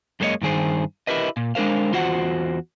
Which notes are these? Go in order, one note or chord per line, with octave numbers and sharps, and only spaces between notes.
F#2 G#3 A#3 D#4 C#5 D#5
G2 D#3 G#4 C5
E4 G4 A#4 B4 D#5
A#2
G#3 D4 A#4 C5 F5
E2 F4 F#4 C5 F#5